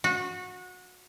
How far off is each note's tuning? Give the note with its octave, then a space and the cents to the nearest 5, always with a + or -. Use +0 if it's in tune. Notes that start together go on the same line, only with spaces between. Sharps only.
F#4 -25